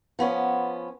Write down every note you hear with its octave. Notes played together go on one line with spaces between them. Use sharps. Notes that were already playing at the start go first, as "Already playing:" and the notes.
F3 B3 C#4